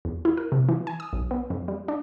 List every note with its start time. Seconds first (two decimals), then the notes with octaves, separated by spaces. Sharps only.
0.05 E2
0.25 E4
0.37 A#4
0.52 C3
0.69 E3
0.87 G#5
1.00 D#6
1.13 B1
1.31 B3
1.50 F2
1.68 G3
1.88 D4